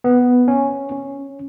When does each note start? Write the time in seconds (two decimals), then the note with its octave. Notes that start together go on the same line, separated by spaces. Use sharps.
0.04 B3
0.48 C#4
0.92 C#4